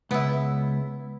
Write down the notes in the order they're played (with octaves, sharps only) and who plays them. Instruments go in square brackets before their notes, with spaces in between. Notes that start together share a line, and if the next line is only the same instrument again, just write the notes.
[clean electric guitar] C#2 [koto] B3 E4